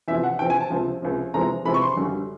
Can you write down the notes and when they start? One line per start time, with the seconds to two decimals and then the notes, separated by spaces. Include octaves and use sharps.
0.08 E2 C3 F3 E5
0.23 F#5
0.39 E2 C3 F3 G5
0.50 G#5
0.61 A5
0.70 C#2 C3 F3
1.02 C#2 C3 F3
1.34 E2 C3 F3 G#3 A#5
1.65 E2 C3 F3 G#3 B5
1.74 C#6
1.81 C6
1.96 G#1 F#2 D3 G3